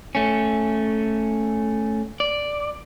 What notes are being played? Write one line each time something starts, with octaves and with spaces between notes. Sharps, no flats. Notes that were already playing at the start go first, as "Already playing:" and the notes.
A3 C#4
D5